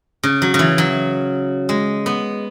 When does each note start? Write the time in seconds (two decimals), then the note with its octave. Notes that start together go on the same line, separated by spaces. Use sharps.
0.23 C#3
0.42 F#3
0.54 C#3
0.59 E3
0.78 F#3
1.69 G#3
2.06 B3